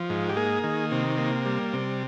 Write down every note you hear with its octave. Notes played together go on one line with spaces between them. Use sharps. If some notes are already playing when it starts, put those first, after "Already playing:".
Already playing: F3
G#2
G4
A#3 G#4
D#3
C3
A#3
G3
C3